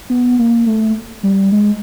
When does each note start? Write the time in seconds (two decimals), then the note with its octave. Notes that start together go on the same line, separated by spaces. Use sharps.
0.10 B3
0.39 A#3
0.66 A3
1.23 G3
1.52 G#3